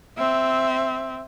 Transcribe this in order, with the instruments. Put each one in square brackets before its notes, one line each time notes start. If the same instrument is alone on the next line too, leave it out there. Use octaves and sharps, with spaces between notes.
[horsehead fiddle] C4 E5